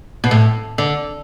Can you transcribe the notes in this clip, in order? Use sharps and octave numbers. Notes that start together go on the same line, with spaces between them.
B2
A2
D3